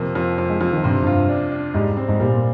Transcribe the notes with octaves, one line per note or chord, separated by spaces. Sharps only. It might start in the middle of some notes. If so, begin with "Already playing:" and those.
Already playing: F2 C3 A#3
F2
F2
G#3
F2 F3
D#3
G2 C3
G2 F4
D4
D4
G#2 G3
C4
G#2
A#2 G3